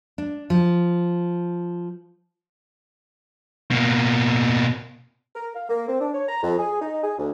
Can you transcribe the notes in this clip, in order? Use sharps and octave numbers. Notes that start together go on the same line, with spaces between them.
D4
F3
B2 A#3
A#4
F5
A#3
C4
D4
C#5
A#5
F2
G#4
D#4
G#4
D2